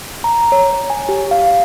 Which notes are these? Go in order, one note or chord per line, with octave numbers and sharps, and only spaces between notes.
A#5
C#5
G#5
G4
F5